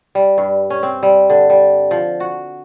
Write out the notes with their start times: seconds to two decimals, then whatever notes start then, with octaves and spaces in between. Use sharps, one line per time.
0.15 G3
0.38 G2
0.70 C#4
0.83 C4
1.03 G3
1.30 D3
1.50 G3
1.91 F3
2.20 F#4